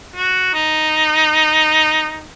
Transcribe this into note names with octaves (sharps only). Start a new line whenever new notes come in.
F#4
D#4